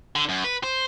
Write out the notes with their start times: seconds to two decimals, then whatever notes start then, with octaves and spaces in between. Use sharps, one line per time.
0.16 D3
0.29 F#2
0.44 B4
0.63 C5